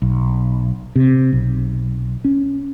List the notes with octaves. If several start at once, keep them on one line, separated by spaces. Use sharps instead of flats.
B1
C3
B1
C#4